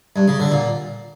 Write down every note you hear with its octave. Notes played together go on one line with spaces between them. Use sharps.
G2
C#3
D3
A#2